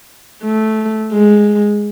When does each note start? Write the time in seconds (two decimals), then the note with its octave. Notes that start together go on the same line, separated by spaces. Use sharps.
0.43 A3
1.12 G#3